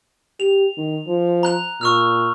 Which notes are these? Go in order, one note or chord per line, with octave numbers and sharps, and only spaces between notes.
G4 F7
D#3
F3
A#5 F#6 F7
A#2 C#6 E6 F6